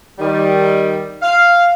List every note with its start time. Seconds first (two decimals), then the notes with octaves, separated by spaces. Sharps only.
0.19 D#3 G3
1.22 F5